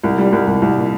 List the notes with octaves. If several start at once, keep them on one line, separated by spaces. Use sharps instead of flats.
C2
G3
C2
C2
C2
A#2